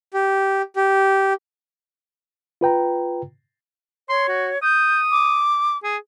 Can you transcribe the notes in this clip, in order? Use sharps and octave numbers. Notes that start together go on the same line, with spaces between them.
G4
G4
F4 B4 G5 A#5
C#5 C6
F#4
D#6 G6
D6
G#4